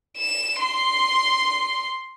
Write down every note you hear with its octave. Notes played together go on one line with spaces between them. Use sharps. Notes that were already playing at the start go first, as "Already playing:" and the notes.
E7
C6